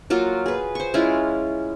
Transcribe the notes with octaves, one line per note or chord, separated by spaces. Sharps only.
F#3 A#3 F4 F#4
G#4 B4
C5 C#6
G#3 C#4 E4 F4